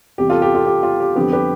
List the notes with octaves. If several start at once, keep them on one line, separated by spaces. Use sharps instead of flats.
E2 C3 G3 G4
F4 A4
G4
F4 A4
G4
F4
G4
F2 D3 G3 B3 G4
G4 B4